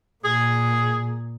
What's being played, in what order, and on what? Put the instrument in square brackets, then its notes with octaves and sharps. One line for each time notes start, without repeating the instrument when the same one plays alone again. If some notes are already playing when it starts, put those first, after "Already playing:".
[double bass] A#2 [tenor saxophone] G#4